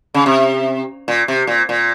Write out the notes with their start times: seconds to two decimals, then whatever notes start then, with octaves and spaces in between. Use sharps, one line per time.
0.14 C#3
0.26 C3
1.08 A#2
1.28 C3
1.47 A#2
1.69 A#2